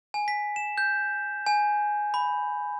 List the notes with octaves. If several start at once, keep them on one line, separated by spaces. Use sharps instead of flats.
G#5
B6
E7
G6
G#5
B5